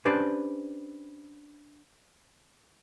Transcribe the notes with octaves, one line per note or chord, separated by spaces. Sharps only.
C#4 D4 G4 B4 C5 D5